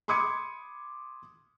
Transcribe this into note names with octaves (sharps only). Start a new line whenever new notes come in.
B5 C6 D6 D#6 G#6 C#7